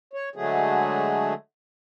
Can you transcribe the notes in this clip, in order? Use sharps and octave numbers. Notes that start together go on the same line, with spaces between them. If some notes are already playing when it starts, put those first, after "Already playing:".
C#5
D3 F#3 G#3 A3 G#4